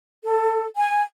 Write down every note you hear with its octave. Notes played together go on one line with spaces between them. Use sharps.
A4
G#5